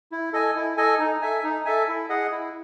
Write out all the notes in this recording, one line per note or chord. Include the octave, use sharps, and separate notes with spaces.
E4
A4 D#5 G#5
E4
A4 D#5 G#5
D#4
A4 E5 G#5
D#4
A4 E5 G#5
E4
G#4 D#5 F#5
E4